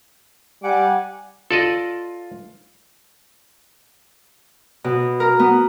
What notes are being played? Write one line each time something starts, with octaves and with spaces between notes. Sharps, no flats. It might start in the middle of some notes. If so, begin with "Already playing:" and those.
G3 F#5 G#5 D6
F4 A4 D5 D#5
B2
A#4
B3